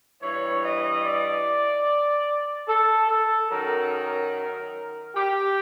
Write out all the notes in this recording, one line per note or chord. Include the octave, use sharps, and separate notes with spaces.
G2 E3 C#5
D#5
D5
A4
A4
F#2 D#3 F#3 A#4
A#4
G4